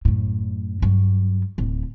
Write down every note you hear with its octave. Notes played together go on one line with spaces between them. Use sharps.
F#2 A2
G2 F#3
D1 A2